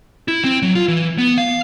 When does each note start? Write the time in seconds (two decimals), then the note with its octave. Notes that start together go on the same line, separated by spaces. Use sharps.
0.28 E4
0.44 C4
0.62 F#3
0.75 F4
0.88 E3
1.18 B3
1.38 F5